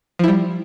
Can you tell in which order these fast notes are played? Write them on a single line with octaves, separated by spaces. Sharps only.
F3 E4 G3